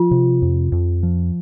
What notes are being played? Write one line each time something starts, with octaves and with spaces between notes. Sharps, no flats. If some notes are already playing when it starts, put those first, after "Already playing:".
Already playing: F3 F4
C3
F2
F2
F3